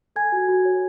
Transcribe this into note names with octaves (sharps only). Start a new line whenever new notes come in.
A4 G#5 G#6
F#4
F#4
C#5